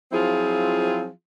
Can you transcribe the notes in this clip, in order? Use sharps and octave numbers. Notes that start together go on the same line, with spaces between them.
F3 F#3 C4 E4 F4 G#4